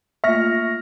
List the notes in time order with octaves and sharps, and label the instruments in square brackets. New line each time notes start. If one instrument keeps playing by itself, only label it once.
[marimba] A3 A#3 F4 [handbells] E5 [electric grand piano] C#6 F6 A#6